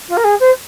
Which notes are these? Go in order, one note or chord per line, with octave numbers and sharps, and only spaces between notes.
F4
A#4
G#4
C5